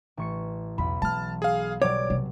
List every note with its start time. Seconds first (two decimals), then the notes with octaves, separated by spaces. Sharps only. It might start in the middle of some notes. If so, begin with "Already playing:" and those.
0.17 A1 C#6 C#7
0.78 B1 E2 B5
1.02 E3 A5 F6
1.42 G#4 F5
1.82 B2 F#3 G3 C#5 D5 D6
2.10 C3